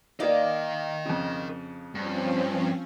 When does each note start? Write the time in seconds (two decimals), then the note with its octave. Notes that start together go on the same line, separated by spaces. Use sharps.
0.20 A#3 D#4 A#4 D5 D#5 F5
1.06 F2 C#3
1.95 G2 F3 C4 C#4